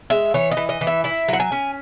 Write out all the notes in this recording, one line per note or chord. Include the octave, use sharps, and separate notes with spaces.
G#3 E5
E3 C#5
D#5
E3
D#5
E3
E5
E4 E5
F#3 F#5
G#5
C#4